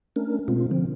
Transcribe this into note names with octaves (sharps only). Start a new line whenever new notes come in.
A3 C#4 D4 A#4
B2 G#3 C4 F4
D3 F3 C4